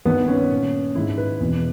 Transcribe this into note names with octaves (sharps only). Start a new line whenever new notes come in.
G2 D#3 B3
C#4
A#2
G#2 D#3 E4
B4
E2 B2